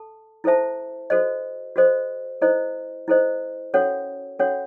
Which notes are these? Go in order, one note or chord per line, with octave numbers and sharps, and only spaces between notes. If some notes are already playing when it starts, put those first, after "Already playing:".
Already playing: A4 A5
E4 A4 C5 E5 A5
F#4 A4 C5 D#5
F#4 A4 C5 D#5
E4 A4 C5 D#5
E4 A4 C5 D#5
C#4 F#4 A4 C#5 F#5
C#4 F#4 A4 C#5 F#5